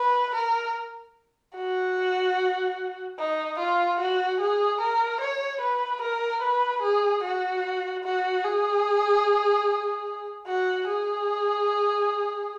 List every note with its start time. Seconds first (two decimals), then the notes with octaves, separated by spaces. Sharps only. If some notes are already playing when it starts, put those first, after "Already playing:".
Already playing: B4
0.35 A#4
1.56 F#4
3.19 D#4
3.59 F4
4.00 F#4
4.40 G#4
4.81 A#4
5.21 C#5
5.61 B4
6.02 A#4
6.42 B4
6.82 G#4
7.23 F#4
8.05 F#4
8.44 G#4
10.47 F#4
10.88 G#4